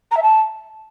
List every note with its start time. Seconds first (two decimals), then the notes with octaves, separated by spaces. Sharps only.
0.11 A#5
0.17 E5
0.22 A5